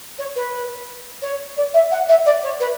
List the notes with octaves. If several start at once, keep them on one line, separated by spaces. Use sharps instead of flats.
C#5
B4
C#5
D5
E5
F#5
E5
D5
C#5
B4